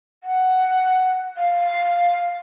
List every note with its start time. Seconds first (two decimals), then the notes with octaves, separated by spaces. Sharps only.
0.23 F#5
1.37 F5